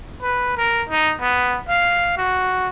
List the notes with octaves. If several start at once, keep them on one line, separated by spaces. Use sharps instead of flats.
B4
A#4
D#4
B3
F5
F#4